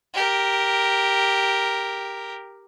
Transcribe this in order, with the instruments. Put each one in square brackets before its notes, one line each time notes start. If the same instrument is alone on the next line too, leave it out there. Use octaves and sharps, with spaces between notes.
[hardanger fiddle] G4 A#4